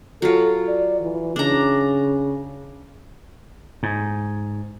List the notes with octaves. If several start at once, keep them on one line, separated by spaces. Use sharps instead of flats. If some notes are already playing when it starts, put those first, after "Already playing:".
F#3 F4 A4
D5
E3
C#3 D4 A#5
G#2